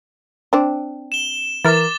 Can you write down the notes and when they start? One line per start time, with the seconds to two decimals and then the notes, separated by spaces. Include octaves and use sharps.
0.53 C4 D4
1.12 E7 G7
1.65 E3 A#4 D6 A6